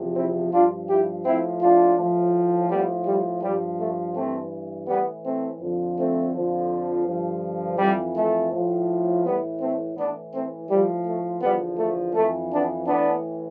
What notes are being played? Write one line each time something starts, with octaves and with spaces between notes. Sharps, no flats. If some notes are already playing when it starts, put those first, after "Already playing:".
Already playing: E2 C3 F3
C4 E4
G2 F3 D4 F4
E4 G4
A2 F3 C4 E4
D4 F4
A2 F3
A2 F3 G3 B3
G3
G2 F3 G3
A3
G2 E3 A3 C4
A2 E3 G3 B3
A3 C4
F2 D3 F3
A3 C4
F2 D3 F3
G2 D3 F3
F2 E3 G3
A3
A2 F3
A2 E3 G3 B3
A3 C4
A2 E3 B3 D4
A3 C4
A2 F3 G3
A3
E2 D3 F3 G3 B3
A3
F2 E3 A3
B3 D4
A2 E3 B3 D4